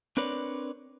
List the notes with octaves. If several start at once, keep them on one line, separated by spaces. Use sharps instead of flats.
C4 D4 A#4 B4 C#5 D5